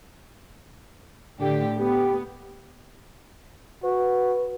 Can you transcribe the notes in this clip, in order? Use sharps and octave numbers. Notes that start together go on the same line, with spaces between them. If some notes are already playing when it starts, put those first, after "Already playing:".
A2 D3 G4
B3 G4
F#4 B4